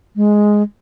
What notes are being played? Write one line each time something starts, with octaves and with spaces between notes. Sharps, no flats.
G#3